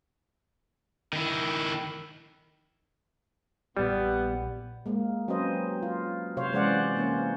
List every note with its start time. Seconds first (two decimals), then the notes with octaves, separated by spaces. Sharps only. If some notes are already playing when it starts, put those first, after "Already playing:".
1.13 D#3 E4
3.77 A#1 G3 B3
4.86 G#3 A#3
5.28 F#3 C4 C#4 B4 C5 D#5
5.83 F4
6.37 C3 C5 C#5 F5
6.53 E3 G#3 C#4 C5 D5 F#5
6.96 A#3 C#4 C5